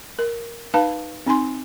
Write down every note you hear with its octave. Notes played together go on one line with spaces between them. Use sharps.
A#4
D#4 B4 F5 A5
C4 D#4 G#5 C6